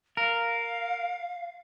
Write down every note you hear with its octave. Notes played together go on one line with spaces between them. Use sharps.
A#4 F5